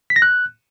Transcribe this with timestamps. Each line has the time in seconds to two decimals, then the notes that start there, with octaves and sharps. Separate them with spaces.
0.10 B6
0.16 A#6
0.22 F#6